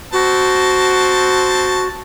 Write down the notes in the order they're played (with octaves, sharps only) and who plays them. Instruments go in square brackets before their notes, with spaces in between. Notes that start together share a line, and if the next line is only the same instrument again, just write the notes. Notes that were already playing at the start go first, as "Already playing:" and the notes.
[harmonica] C4 A5 [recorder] F#4